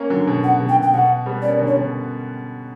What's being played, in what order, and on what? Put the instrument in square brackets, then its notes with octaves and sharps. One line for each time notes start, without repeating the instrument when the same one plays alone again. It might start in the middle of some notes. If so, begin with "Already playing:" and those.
Already playing: [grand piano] A#3 C#4
D3 F#3
B2 D3
[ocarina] F#5
[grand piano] B2 D3
[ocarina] G5
[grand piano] B2
[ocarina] G5
[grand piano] B2 [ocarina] F#5
[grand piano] G3 B3
[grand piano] A#3 C#4 [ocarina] D5
[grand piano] B2 D3
[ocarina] C#5
[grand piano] B2 D3